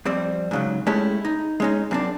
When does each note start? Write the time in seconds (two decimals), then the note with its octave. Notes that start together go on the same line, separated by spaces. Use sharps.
0.05 F2 G3 C4
0.51 G#2 C#3 F#3
0.87 G#3 A3 C#4 E4 G4
1.25 D#4
1.60 G#3 C#4 D#4
1.91 F#2 C4 D4